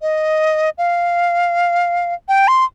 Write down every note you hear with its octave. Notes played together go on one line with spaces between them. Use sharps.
D#5
F5
G5
C6